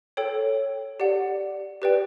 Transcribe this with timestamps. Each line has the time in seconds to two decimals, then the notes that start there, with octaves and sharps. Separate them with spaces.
0.17 A4 C#5 G5
1.00 G4 D5 F#5
1.82 G4 B4 D5 G5